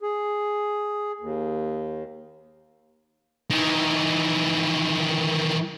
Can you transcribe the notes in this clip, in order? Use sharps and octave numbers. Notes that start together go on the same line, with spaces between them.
G#4
D#2
D#3 E3